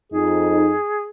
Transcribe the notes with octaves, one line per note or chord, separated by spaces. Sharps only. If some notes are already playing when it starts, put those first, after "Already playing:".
F2 D#4 G#4